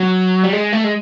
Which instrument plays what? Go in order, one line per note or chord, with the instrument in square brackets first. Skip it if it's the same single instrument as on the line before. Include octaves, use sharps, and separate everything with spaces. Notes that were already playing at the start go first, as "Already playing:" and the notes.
Already playing: [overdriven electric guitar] F#3
G3
G#3
A3
G#3